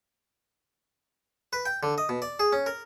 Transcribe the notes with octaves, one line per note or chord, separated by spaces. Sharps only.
B4
G5
D3
D#5
B2
D5
G#4
C#4
A#4